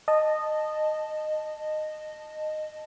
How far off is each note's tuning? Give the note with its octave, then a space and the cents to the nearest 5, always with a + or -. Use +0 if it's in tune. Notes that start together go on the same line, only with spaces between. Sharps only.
D#5 -15 A5 +0